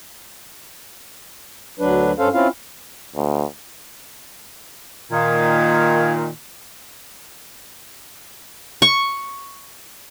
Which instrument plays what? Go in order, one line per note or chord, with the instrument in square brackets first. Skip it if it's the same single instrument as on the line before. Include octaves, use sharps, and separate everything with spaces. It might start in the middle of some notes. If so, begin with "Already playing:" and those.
[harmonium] D2 F#3 D4 B4
G2 C#4 A4 C5 F5
C4 C#4 E4 F4 F5
[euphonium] D2
[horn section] A#2 D#3 [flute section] F5 D#6 G#6
[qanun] C#6